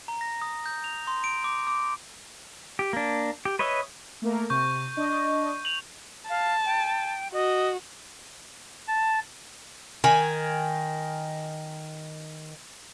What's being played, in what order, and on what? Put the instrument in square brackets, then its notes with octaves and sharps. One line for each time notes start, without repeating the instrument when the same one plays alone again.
[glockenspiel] A#5
A#6
D#6
G6
F7
C6
D7
D6
D6
[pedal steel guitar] G4
A#3 D4
G4
B4 C#5 D#5 E5
[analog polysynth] A3 A#3 A#4
[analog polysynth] C3 [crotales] C#6 G6
[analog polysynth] D4 D#5
[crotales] F7 F#7
[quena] F5 [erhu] A5
[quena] G5
[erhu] F#4 [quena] D#5
[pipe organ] A5
[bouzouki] D#3 G#5